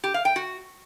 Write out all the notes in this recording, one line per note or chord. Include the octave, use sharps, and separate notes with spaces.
G4
F5
G5
F#4